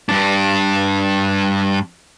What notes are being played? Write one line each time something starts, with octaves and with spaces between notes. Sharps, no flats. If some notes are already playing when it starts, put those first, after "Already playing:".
G2 D4